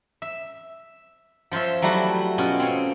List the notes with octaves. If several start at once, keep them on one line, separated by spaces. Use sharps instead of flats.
E5
F3 F4 C5 C#5 E5
F#3 G3 A3 E4 F#4
B2 C#4 F4
C4 C#5